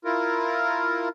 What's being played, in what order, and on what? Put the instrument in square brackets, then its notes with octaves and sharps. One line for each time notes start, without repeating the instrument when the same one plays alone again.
[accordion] E4 F4 A#4